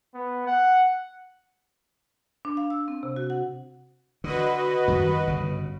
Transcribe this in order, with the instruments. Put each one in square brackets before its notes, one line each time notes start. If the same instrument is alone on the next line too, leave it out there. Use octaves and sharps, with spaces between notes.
[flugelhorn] B3
F#5
[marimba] D4
F5
E6
C4
C3
F#4
F#5
[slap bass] D3 [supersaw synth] F#4 B4 D#5
[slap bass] F#2 D#3 G3
G1 C#3